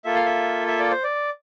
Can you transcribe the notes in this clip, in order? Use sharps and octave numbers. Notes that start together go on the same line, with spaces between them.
A#3 F4 A4 E5
F5
E5
E5
D5
C5
D5